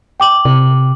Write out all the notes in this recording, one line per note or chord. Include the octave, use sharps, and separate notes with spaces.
G5 D6 F#7
C3